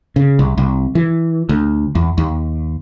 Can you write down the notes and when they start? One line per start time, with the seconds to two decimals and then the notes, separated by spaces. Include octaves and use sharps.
0.16 C#3
0.39 C2
0.58 C2
0.95 E3
1.49 D2
1.95 E2
2.18 D#2